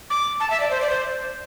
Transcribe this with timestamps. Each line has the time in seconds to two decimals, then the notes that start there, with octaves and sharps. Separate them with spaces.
0.10 D6
0.40 A5
0.50 E5
0.60 D5
0.71 C5
0.81 D5
0.90 C5